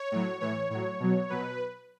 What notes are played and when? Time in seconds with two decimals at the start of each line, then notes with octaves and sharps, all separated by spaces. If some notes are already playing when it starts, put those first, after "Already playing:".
Already playing: C#5
0.12 A2 F#3
0.40 A2 E3 C#5
0.70 A2 F#3 C#5
1.00 B2 F#3
1.30 B2 F#3 B4